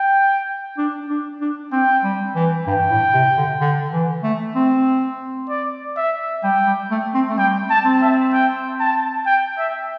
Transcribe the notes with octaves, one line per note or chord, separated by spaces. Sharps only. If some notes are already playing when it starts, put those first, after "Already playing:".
Already playing: G5
D4
D4
D4
C4 G5
G3
E3
G2 G5
A2
C3
D3
D3
E3
A3
C4
D5
E5
G3 G5
G3
A3
C4
A3
G3 G5
A5
C4
E5
G5
A5
G5
E5